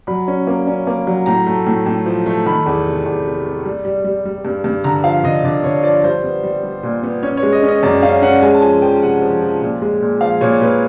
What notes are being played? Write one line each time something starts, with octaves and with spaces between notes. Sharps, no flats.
F#3 B5
C#4
A#3
C#4
A#3
F#3
A2 A#5
A3
A2
A2
F3
A3
D#3 B5
E2
C3
E2
C3
C3
G3
G3
G3
G3
G2
G2
D3 A#5
F3 F5
D3 D#5
D3 D5
D3 C#5
F3 D5
G3 C5
B3
G3
G3
A#2
B3
C#4 C#5
C#5
G#3
D#5
C#4
D#5
F#2 D5
C#4 F5
C#4 F#5
G#3 G#5
A5
F3 G#5
F3 G5
C3 F#5
F3
F3
A#2
G#3
A#2
F3 F5
A#2 C#5
A#2 B4